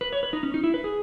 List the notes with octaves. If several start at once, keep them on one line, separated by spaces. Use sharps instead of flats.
B4
C#5
B4
D#4
C#4
D#4
E4
B4
G#4